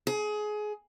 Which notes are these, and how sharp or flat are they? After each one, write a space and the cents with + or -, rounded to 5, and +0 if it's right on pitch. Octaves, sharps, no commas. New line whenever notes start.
G#4 +25